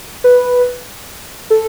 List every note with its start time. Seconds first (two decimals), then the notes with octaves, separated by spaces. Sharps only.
0.24 B4
1.50 A4